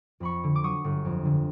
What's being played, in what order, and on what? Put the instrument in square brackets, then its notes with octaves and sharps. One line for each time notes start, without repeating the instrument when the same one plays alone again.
[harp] F2 B5 C#6
D3
D6
F#3 C#6 D#6
G1
F2
D3